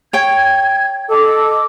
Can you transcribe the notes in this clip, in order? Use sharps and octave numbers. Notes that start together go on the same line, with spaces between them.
C#5 G5 G#6
A4 D#5 D6 E6